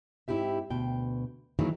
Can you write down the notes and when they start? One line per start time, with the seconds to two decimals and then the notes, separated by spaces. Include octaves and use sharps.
0.28 G#2 C4 E4 F#4 G4 E5
0.70 D2 B2 G5
1.59 D#3 E3 F#3 A#3 D#4 G#4